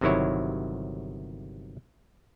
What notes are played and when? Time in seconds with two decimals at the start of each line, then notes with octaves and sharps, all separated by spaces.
0.01 G1 C3 D#3 F#3 E4 C#5